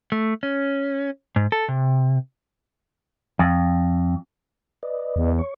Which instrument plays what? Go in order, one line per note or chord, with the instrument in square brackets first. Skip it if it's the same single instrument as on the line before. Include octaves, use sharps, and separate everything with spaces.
[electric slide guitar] A3
C#4
G#2
A4
C3
[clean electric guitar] F2
[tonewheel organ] B4 D5 D#5
[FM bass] E2
[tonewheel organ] C#5 C#6